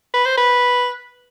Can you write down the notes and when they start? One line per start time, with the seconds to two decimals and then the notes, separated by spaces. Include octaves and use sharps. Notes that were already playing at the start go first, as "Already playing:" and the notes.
0.14 B4
0.26 C5
0.37 B4